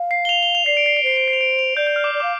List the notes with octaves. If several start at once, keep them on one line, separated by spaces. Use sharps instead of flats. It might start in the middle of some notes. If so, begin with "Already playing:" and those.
Already playing: F5
C7
G7
F7
G7
F7
D5 C7
D7
C7
D7
C5 C7
D7
C7
F7
D7
F7
D5 G6
G6
F6
D6
D5
F5 D6